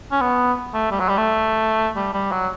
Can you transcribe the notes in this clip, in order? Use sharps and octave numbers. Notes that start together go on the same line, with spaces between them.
C#4
B3
A3
G3
F#3
G3
A3
G3
G3
F#3